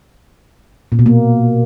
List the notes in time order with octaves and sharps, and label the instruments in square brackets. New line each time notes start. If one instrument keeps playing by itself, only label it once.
[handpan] A#2
B2
A#3